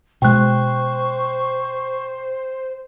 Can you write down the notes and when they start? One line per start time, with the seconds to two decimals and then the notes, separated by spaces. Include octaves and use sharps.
0.22 B2 G#3 C5 G5 C#6 F#6